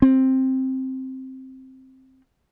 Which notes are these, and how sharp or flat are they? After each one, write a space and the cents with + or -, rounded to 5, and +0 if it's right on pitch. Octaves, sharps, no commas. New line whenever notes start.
C4 +5